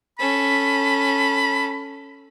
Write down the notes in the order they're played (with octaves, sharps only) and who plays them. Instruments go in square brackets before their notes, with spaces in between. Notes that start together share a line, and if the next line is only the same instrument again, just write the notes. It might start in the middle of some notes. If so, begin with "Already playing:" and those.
[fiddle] C#4 A4 [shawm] B5